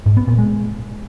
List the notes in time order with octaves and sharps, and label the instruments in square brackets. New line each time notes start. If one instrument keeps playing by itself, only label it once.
[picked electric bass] G#2
B3
A#2
G#3